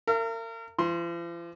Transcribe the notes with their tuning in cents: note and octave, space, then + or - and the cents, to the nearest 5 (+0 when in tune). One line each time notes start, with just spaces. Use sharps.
A#4 -35 E5 +45
F3 -45 C6 +15